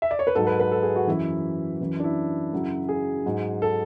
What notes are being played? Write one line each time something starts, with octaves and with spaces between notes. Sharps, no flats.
E5
D5
C#5
B4
G#2 F#3 A4
B4
B4
A4
G#4
F#4
F#2 E3 E4
F#2 E3
D4
E4
F#2 C#3 F#3
G#4
G#2 F#3
A4